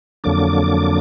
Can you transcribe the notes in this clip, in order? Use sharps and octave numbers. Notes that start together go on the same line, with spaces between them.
F2 D3 F#3 A#3 D4 D6